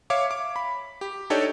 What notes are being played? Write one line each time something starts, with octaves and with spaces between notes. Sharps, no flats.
C#5 E5 F5 D6
D6
B5
G4
D4 D#4 G4 A4 C#5 D5